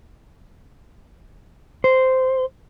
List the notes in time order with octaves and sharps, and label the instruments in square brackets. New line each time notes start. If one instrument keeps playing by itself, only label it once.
[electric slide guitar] C5